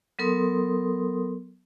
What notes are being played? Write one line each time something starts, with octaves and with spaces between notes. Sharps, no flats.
F#3 B3 A4 A#4 C6 D#6